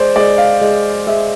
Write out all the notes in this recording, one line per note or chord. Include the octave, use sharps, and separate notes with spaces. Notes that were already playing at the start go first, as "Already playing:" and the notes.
Already playing: G#3 C5 D5
G#3 D5
F5
G#3
G#3 E5